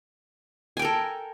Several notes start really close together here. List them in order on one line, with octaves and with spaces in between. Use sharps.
G#5 G5 A#4 A4